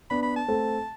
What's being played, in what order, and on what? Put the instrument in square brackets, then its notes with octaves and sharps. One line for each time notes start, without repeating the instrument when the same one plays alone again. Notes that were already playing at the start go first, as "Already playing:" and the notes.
[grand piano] B3 D4 [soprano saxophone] B5
[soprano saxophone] B5
A5
[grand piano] A3 C4